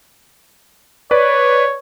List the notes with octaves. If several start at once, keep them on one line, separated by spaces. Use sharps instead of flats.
B4 C#5 D5